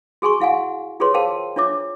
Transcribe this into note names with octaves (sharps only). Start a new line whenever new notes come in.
F#4 G#4 G#5 C6 C#6
E4 F5 F#5 G#5
F4 G4 G#4 B4 C#5 C6
G#4 A#4 C5 F5 G5 A5
D4 F4 C#5 E5 D6